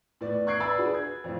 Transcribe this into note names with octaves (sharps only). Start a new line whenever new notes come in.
A2 B3 D5
C#6 F#6 G#6 C7 D7
B4 D5 G#5 B5 E6 A6
D4 F#4 G#4 B4
B4 G#6
F2 A2